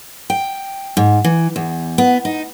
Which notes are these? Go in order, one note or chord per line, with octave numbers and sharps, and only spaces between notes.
G5
G#2
E3
E2
B3
D#4